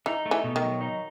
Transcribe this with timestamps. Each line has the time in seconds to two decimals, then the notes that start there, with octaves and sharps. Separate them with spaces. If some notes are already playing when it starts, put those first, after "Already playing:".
0.06 E3 D#4
0.26 A3
0.31 E3
0.44 B2
0.56 D#3
0.63 F#3
0.81 D#4